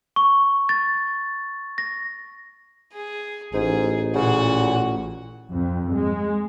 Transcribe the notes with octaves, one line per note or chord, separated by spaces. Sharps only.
C#6
A6
A#6
G#4
A1 G#2 G#4
A#2 C#3 F#4 F#5
F2
G#3